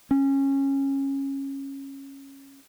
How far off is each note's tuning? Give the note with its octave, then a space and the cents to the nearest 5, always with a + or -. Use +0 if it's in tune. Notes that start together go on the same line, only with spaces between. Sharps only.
C#4 -15